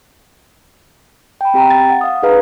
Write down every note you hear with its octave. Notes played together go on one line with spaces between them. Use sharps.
G5 B5
C4 G4 G5 A#5
A6
F#5
F5 D#6
D#4 G#4 B4 F5 A#5